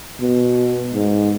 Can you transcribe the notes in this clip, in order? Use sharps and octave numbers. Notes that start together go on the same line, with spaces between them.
B2
G#2